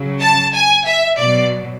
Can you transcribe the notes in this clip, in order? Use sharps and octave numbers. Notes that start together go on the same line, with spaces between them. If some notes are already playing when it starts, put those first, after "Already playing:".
Already playing: C#3 F#3
A5
G#5
E5
B2 F#3 D5